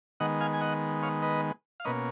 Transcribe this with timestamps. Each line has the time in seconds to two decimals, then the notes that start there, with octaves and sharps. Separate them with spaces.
0.20 D#3 G#3 B3 D#5 F#5
0.40 F5 G#5
0.53 G#5
0.61 D#5 F#5
1.03 C#5 F5
1.22 B4 D#5
1.80 F5
1.85 B2 A#3 C#4 B4 D#5